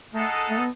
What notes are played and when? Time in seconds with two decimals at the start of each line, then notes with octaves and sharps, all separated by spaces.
0.13 G#3 A3 D#4 A4 D#5 F#5
0.50 A3
0.59 B3